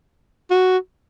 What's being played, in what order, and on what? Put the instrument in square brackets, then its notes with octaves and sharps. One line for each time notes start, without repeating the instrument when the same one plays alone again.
[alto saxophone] F#4